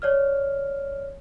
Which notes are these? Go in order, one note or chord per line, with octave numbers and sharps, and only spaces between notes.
C#5 D5 F6